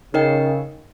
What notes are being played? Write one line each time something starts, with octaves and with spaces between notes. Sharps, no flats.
C#3 D#4 A#4 D#5 G5